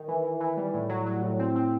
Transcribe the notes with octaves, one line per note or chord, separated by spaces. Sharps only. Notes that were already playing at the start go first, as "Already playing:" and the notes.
Already playing: D#3
E3
E3
E3
G3
A2
F#3
F#3
A2
C4
C4